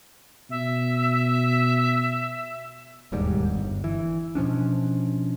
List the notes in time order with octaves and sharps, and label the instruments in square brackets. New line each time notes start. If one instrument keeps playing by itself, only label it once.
[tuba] B2 [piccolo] E5
[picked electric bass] E1 D#2 G#2 G3
G1
E3
B2 F3 C#4 D4